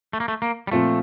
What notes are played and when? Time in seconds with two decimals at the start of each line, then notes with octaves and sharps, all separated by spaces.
0.13 A3
0.20 A#3
0.28 A3
0.42 A#3
0.67 G3
0.71 A#2 F3 A3 C4 F4